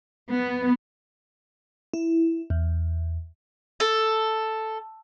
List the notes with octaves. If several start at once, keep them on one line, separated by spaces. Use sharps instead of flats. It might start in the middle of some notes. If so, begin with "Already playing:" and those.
B3
E4
E2
A4